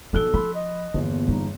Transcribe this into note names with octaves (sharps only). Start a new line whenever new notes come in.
B1 F3 B3 A4 F#6 G7
F3 B5 C6
D#5
G1 E2 A#2 B3
G3 D#4